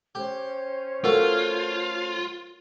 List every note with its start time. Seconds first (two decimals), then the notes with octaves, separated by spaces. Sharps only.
0.15 C#4 G4 C5 C#5
1.04 A3 F4 F#4 A#4